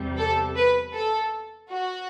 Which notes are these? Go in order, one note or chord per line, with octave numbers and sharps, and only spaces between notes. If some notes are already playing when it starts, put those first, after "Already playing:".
Already playing: E2 C3 G3
A4
B4
A4
F#4